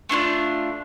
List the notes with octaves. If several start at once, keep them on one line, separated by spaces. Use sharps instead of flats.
A3 D4 E4 F4